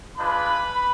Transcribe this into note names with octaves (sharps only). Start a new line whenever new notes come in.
G#3 D4 F4 B4 B5